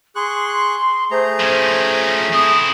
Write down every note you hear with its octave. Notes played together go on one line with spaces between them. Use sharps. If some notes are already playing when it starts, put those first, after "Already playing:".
G#4 C6 C#6 F#6
A3 G#4 C5 A#5
F3 C#4
C4 E4 D#6